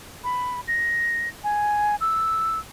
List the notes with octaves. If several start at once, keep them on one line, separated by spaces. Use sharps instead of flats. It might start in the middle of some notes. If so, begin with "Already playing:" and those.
B5
A#6
G#5
E6